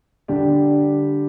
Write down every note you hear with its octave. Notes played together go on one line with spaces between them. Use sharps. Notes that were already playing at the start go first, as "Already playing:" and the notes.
D3 G3 D4 G4